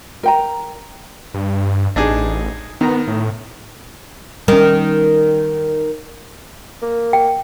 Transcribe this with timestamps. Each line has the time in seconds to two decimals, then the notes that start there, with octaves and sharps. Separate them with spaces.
0.23 A#4 G5 A#5
1.34 G2
1.96 A1 D4 D#4 G#4
2.81 D#3 B3 A#5
3.07 A2
4.48 D#3 G3 C#4 A#4
6.82 A#3
7.13 G5